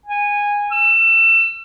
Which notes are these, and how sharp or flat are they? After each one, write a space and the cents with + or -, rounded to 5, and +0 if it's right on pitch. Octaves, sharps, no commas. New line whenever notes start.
G#5 -15
E6 +30